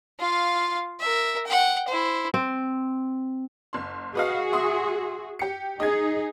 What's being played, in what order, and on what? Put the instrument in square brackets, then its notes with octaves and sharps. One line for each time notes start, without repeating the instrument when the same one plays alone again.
[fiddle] F4 F5
A#4 E5
F#5 G5
E4 C5
[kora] C4
[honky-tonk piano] F#1 C6
[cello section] F#4 G#4 [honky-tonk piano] B4 D#5 F5
[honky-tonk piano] E5 C6 D#6
G4 C#7
[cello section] D#4 G#4 [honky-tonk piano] D#5 G#6